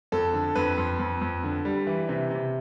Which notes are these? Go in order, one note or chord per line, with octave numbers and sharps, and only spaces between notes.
F2 A4
D3
F2 B4
F2
F2
F2
D3
G3
E3
C3
C3